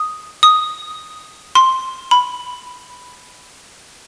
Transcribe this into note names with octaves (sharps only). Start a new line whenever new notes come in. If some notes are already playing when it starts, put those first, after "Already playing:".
Already playing: D#6
D#6
C6
B5